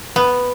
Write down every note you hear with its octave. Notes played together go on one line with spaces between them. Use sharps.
B3